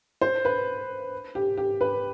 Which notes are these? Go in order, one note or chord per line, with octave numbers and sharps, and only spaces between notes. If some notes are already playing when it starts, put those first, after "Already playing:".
C5
B4
G4
G4
B4